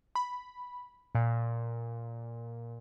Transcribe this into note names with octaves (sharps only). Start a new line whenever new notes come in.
B5
A#2